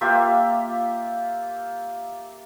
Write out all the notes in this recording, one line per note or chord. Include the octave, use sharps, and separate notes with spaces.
A#3 F4 G4 E5